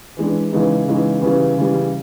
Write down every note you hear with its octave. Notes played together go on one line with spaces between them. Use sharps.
E3 G#3 B3 D4
C#3 E3 G#3 B3 D#4
C#3 E3 G#3 B3 D#4
C#3 E3 G3 B3
C#3 E3 G3 B3